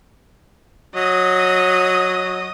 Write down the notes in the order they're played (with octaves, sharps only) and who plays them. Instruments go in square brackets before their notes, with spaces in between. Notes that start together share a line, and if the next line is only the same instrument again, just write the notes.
[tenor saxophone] F#3 [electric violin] D#5 D#6